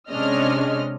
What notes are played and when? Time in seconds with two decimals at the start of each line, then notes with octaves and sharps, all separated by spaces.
0.10 C3 G#3 C#4 D4 D#5 F6